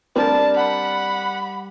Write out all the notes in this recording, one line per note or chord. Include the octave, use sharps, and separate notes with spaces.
G3 C4 D4 A#4 A5
F#5 B5